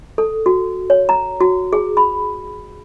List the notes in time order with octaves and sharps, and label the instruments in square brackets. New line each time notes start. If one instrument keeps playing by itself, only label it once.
[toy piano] A4
F#4
C#5
A#5
F#4
G#4
B5